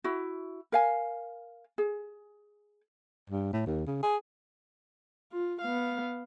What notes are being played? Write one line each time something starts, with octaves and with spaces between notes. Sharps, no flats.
E4 F#4
A#4 F5 G#5
G#4
G2
A2
D#2
C#3
G#4
F4
B3 F5